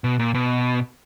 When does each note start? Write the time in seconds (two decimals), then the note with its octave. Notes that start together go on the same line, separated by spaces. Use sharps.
0.04 B2
0.19 A#2
0.34 B2